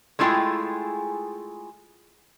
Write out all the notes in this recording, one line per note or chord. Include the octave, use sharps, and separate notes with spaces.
G#3 A3 E4 F4 G#4 G5